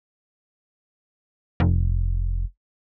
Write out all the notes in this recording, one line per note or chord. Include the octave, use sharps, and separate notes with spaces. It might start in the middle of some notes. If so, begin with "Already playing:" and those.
F1